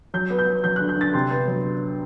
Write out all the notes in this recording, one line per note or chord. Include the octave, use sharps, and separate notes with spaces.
F#3 G6
B3
G6
B3
F#3 G6
F#6
D3
G6
D3 A6
C3 C6
B3
F#3